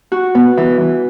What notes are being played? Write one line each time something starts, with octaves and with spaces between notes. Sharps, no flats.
F#4
B3
E3
E3